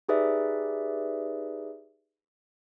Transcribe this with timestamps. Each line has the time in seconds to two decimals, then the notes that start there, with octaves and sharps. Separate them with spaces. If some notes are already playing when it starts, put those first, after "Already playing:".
0.09 D#4 G4 G#4 B4 D5 E5